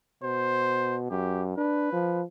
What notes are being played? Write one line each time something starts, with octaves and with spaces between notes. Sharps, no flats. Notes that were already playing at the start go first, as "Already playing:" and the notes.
B2 C5
F#2 G4
D4 B4
F3